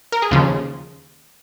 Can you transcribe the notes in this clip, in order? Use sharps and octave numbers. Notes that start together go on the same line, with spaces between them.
A#4
G#4
D#2 C#3 F3 F4